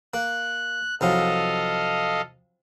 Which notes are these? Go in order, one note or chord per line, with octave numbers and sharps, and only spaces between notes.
A#3 F#6
C2 F3 F#3 A4 D#5 F5